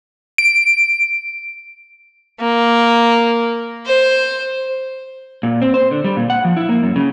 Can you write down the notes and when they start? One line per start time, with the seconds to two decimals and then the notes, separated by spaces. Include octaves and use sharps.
0.38 D7
2.41 A#3
3.87 C5
5.43 A#2
5.62 C4
5.74 C5
5.91 D3
6.04 G3
6.17 A#2
6.30 F#5
6.44 F3
6.57 E4
6.69 A#3
6.83 F#2
6.96 C#3